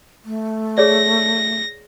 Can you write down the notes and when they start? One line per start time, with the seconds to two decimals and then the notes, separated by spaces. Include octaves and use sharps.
0.25 A3
0.78 G#4 C#5 D5 A#6